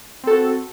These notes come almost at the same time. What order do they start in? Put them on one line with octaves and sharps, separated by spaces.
C4 A4 F#4